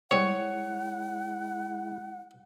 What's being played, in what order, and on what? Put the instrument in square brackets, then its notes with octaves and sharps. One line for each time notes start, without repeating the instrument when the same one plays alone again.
[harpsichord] G3 C4 G#4 [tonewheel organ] G#3 E4 [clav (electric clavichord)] C#5 [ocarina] F#5